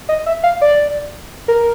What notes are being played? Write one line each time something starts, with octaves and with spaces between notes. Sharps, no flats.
D#5
E5
F5
D5
A#4